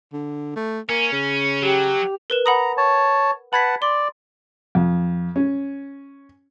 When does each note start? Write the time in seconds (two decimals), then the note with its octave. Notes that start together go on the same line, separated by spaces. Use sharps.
0.13 D3
0.56 A3
0.89 A#3 C#4
1.12 C#3
1.62 F#3 G4
2.30 A#4 B4 E7
2.46 F#5 A#5 B5 D#6
2.77 C#5 A5
3.53 B4 F#5 A5 B5 G#6 B6
3.82 D5 C6
4.75 F2
5.36 C#4